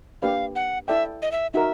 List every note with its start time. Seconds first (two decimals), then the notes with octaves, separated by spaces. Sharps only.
0.22 A#3 D4 G4 B4 D5 F5
0.56 F#5
0.88 E4 A4 D5 E5 G5
1.22 D#5
1.32 E5
1.54 D#4 F#4 A#4 E5